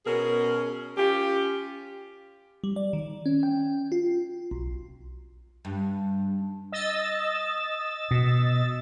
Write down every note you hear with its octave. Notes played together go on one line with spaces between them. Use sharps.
B2 C#4 G#4 A#4
C#4 F4 G4
G3
D5
D#3
C#4
G5
F4
B1
G2
D#5 E6 A6
B2